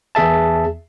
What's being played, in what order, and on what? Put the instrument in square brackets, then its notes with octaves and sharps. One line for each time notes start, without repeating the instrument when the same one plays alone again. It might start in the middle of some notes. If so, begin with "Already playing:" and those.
[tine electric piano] E2 G#4 E5 A5